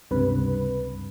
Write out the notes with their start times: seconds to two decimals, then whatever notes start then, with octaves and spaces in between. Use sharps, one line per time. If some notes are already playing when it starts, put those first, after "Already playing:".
0.11 C#2 G2 C3 B4